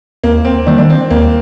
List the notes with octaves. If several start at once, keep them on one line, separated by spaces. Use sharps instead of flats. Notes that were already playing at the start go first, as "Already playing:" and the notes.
D#2 A#3
C4
D#3 G3 A#3 D4
D4
C4
D#2 A#3